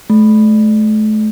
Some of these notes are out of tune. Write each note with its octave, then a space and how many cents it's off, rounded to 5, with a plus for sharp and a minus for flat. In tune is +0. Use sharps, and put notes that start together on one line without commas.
A3 -35